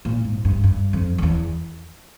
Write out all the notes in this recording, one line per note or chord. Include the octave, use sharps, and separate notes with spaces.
A#2
G#2
G2
G2
F2
F2
E2